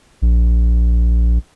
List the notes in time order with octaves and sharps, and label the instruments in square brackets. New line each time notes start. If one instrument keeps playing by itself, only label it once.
[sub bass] A#1